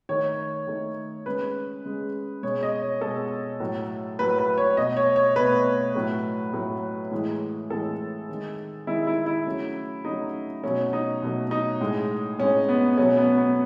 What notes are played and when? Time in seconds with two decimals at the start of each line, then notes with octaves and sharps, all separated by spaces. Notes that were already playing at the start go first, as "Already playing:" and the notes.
0.09 D#3 A3 C#5
0.67 D#3 A3
1.26 C#3 G#3 B4
1.85 C#3 G#3
2.43 B2 G#3 C#5
2.63 D#5
2.82 C#5
3.01 B2 G#3 A4
3.60 A2 F#3 A3
4.19 A2 F#3 A3 B4
4.39 B4
4.58 C#5
4.77 B2 A3 D#5
4.97 C#5
5.16 C#5
5.36 B2 A3 B4
5.95 A2 F#3 A3
6.53 A2 F#3 A3
7.11 A2 E3 G#3
7.70 A2 E3 G#3 A4
8.29 D#3 G#3
8.87 D#3 G#3 E4
9.07 E4
9.26 E4
9.46 C#3 F#3 A3
10.05 C#3 F#3 A3 D#4
10.64 B2 F#3 A3 C#4
10.93 D#4
11.22 B2 F#3 A3
11.51 D#4
11.81 A2 G#3
12.39 A2 G#3 C#4
12.69 B3
12.97 B2 F#3 A3 C#4
13.17 B3
13.37 B3